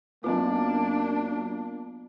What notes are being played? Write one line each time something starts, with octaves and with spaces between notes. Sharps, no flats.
F#2 F#3 A#3 B3 D4 F4